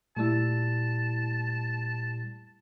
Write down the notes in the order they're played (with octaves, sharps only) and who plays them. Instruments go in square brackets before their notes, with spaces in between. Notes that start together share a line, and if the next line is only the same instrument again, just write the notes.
[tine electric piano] A#2 G3 [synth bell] A3 E4 [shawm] A5